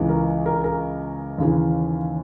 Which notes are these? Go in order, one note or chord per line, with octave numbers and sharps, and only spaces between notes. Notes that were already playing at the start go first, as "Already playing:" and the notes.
Already playing: C#2 C#3 E3
A#4
A#4
A#4
D#2 C#3 E3